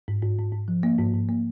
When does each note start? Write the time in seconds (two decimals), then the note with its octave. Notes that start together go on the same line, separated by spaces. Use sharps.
0.08 G#2
0.22 G#2
0.38 G#2
0.53 G#2
0.68 F3
0.83 A#3
0.98 G#2
1.14 G#2
1.29 A#3